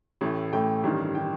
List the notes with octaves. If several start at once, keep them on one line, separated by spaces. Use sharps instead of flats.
A1 A2 A3
A1 A2 A3 G5
A1 G2 D#3
D#3 G5